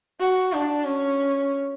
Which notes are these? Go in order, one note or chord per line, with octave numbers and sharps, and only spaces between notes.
F#4
D4
C#4